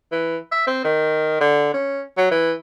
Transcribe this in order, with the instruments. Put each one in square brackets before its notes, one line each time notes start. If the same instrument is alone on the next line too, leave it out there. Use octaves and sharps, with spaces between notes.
[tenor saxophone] E3
E5
C4
D#3
D3
C#4
F#3
E3